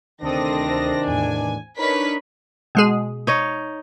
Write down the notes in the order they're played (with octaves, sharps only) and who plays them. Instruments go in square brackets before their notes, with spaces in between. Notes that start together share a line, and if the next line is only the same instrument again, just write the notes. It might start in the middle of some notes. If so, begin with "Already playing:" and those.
[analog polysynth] D2 A4 D#6 [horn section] C3 D#3 D4 [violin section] C4 A#6
[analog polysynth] E2 A2 [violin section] G#5
[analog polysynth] D4 D#4 A#4 [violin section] B4 C#5 B6
[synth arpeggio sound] B2 G#3 G#4
[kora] D#4 C#5 D#5